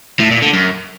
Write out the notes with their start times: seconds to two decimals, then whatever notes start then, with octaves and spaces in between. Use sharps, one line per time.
0.19 A2
0.31 A#2
0.42 D3
0.53 F#2